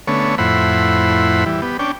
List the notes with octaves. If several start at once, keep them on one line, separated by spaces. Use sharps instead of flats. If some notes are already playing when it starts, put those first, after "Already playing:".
D3 A3 B3 C#4 C#5
F2 A2 E4 C5 F#5 B5
E3 G3
B3 G4
C#4 D4 G5